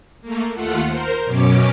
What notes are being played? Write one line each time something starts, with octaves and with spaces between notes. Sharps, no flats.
A3 A#3
D#2 A3 F4 F#5
A#4 C5
F#2 B2 C#4 D6